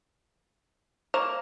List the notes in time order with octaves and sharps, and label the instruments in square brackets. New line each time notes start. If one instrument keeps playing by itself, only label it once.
[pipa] A#3 [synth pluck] C5 C#6 E7